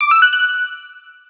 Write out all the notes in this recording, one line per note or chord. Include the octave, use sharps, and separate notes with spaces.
D6
E6
F#6
F#6